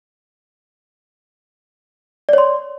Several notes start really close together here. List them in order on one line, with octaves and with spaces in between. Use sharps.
D5 C#5 C6